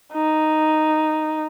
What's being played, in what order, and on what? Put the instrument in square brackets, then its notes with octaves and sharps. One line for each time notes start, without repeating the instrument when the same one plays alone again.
[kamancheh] D#4